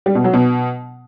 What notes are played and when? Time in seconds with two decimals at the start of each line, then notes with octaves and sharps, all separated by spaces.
0.06 G3
0.15 B2
0.24 F#3
0.33 B2